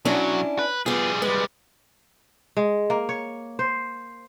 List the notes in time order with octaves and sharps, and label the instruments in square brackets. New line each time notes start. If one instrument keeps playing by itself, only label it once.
[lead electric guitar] B2 F#3 [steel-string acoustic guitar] C#4 D4 E4
[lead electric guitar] B4
[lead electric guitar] G3 G#4 [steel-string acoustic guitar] B3 F4
[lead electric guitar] G3 G#3 [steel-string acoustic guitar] B4
[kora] G#3
A#3
C#5
C5